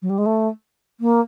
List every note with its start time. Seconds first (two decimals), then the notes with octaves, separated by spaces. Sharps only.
0.02 F#3
0.09 G3
0.18 G#3
0.26 A3
1.00 A#3